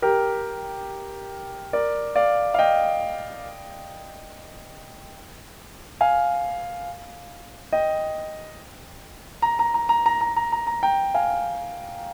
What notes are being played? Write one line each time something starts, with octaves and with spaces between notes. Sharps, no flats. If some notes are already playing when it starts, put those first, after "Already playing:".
G4 A#4
A#4 D5
D5 F5
F5
D#5 G5
F5 G#5
D#5 G5
A#5
A#5
A#5
A#5
A#5
A#5
A#5
A#5
A#5
G5 A#5
F5 G#5